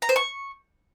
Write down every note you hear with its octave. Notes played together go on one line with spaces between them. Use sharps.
A#5
C5
C#6